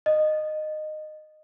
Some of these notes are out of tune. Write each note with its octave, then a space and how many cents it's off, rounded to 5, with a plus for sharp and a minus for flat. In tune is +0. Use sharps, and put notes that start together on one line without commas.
D#5 -15